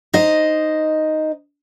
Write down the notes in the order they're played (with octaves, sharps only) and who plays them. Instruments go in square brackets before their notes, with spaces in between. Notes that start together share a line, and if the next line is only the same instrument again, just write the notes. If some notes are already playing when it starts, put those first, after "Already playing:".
[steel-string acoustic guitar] D#4 C5 D#5